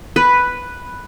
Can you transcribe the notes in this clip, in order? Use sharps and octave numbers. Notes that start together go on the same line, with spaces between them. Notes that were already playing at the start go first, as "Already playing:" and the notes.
B4